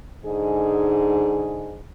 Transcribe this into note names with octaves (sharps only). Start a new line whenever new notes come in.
G#2 D3 D#4 G#4